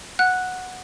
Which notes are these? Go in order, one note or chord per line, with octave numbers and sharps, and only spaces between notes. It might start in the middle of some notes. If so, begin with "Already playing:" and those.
F#5 F#6